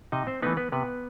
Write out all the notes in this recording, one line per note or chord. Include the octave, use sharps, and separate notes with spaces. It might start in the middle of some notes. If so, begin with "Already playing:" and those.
C3 D#4 D#5
C4 C5
E3 A3 B3 D#4 B4
B3 B4
C3 B3 B4